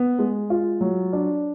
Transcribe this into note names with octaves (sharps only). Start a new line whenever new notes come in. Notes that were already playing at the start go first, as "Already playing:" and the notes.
Already playing: B3
G#3
F4
F#3
D4